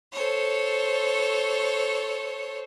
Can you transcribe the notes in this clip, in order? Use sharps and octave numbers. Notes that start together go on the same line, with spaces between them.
A4 C5 C#5